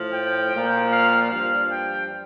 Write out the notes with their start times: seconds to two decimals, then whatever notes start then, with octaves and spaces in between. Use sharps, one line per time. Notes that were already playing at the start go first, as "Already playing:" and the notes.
Already playing: A2 F3
0.14 G5
0.53 A#2 F3
0.93 F5
1.31 G2 F3 F5
1.71 G5